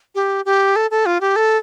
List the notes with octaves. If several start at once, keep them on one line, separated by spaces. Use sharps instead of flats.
G4
G4
A4
A4
F4
G4
A4